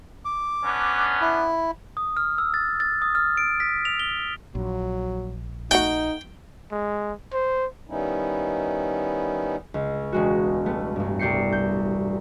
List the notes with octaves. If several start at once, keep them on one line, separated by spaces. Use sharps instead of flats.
D6
B3 C#4 D4
E4
D#6
F6
E6
A6
A6
D#6
F6
D7
B6
F7
G7
A#1 F#3
A3 D#4 F#4 F#5 G5
G#3
C5
D#3 G3 B3 C#4 D#4 E4
C#2
E1 G#3 F#4
G3 A3 B3
A1 G2
C2 D5 G6 C7 C#7
G6